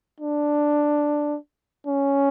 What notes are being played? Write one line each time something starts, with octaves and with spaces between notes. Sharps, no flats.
D4
C#4